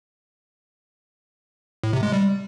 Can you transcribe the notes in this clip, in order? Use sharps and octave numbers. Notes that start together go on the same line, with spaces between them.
A2
C3
G#3
G3